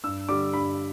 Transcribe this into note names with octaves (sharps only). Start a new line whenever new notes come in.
G2 E6
D3 G3 D6
G2 B5